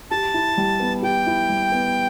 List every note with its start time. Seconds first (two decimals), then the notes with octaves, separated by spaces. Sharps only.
0.11 G4 A5
0.34 E4
0.57 G3
0.80 B3
1.03 G4 G5
1.26 E4
1.49 G3
1.72 B3